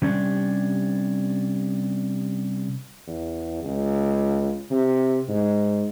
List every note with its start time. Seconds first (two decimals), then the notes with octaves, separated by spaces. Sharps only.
0.02 C3 G3 C#4 D4
3.07 E2
3.64 C#2
4.70 C3
5.29 G#2